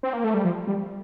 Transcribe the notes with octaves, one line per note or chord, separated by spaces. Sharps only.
C4
A#3
A3
G3
F3
G3